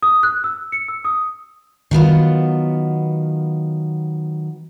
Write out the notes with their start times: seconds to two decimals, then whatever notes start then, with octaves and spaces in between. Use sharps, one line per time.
0.02 D#6
0.23 F#6
0.44 E6
0.72 C#7
0.88 E6
1.05 D#6
1.91 D#3 F#3 B3 F4